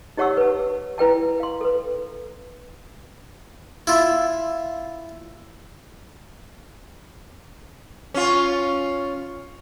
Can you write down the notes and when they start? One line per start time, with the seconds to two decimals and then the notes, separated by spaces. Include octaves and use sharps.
0.17 D#4 G4 C#5 F#5 C#6 E6
0.37 B4 A5
0.98 E4 B4 G5 A5
1.40 F5 C6
1.61 A4 B4
3.87 E4 F4
8.14 C#4 F4